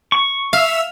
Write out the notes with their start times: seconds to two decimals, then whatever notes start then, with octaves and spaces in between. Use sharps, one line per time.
0.12 C#6
0.53 E5 F5 E6